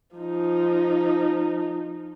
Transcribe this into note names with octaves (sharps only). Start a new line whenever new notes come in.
F3 D#4